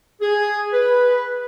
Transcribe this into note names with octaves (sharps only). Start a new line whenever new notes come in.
G#4
B4